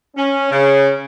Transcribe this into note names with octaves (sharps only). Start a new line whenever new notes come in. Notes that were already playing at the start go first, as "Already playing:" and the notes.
C#4
C#3